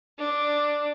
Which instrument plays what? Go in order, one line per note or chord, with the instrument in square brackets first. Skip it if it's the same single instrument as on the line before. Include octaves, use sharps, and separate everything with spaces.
[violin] D4